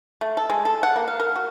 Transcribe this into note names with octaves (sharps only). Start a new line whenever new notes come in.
A3
A4
G#3
A4
F#5
A#3
F5
A#4
F#4